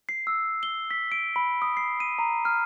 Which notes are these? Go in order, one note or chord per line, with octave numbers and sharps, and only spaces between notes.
C7
E6
G7
B6
D7
B5
D#6
C7
D#7
A#5
F6